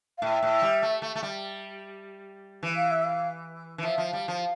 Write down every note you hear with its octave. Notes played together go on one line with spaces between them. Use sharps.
F5
A2 E5
A2
G3
A3
A3
A3
G3
E3
F5
E5
F5
E3
F3 E5
F3
G3
F3